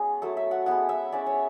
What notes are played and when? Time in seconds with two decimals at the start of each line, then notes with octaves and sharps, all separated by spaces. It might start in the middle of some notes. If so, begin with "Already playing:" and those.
Already playing: G#3 B3 C#4 G#4
0.22 F#3 A3 E4 A4
0.37 E5
0.51 F#5
0.66 G#3 B3 E4 F#5
0.89 E5
1.12 G#3 C#4 E4 D5
1.26 C#5